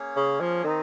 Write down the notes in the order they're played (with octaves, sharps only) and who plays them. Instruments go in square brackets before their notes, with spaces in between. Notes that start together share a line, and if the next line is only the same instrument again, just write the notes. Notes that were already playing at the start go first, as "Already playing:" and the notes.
Already playing: [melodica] A#3 C#4 G#4 C#5
[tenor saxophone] C#3
F3
[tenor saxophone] D#3 [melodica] C4 D#4